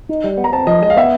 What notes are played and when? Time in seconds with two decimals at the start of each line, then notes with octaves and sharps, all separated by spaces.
0.09 D#4
0.24 G3
0.38 B3
0.44 A#5
0.53 C4 A5
0.67 F3 D#5
0.82 G#3 D#5
0.90 F5
0.97 B3 E5